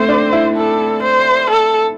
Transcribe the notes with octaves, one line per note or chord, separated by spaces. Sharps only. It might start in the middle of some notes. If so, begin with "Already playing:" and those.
Already playing: A3 C4 C5
D4
E4
A4
C5
A4